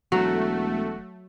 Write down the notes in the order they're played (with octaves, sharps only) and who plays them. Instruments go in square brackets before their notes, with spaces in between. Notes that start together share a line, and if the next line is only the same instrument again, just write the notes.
[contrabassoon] E1 [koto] F#3 [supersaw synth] A3 [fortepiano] F#4